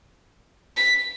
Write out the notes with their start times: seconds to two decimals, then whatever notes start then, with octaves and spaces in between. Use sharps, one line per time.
0.77 B6